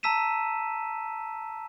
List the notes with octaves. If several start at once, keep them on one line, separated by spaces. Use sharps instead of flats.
A5 A#5 E6 B6 D#7 E7